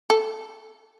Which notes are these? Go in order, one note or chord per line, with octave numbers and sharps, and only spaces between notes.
A4